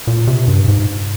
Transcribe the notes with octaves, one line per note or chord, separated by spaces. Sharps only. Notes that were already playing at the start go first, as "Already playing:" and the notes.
A#2
C3
G2
G#2